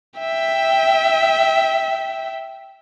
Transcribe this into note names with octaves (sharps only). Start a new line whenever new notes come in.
E5 G5